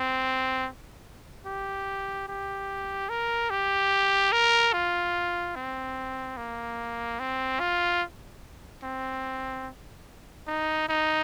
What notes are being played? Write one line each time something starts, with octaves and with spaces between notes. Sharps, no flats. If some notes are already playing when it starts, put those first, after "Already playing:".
Already playing: C4
G4
G4
A#4
G4
A#4
F4
C4
A#3
C4
F4
C4
D#4
D#4